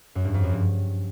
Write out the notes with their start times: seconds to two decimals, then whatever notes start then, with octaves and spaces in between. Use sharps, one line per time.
0.15 F#2
0.25 G2
0.34 F2
0.44 F#2
0.53 G2